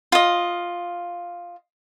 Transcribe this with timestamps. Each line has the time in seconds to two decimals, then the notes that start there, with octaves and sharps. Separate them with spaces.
0.12 F4 D#5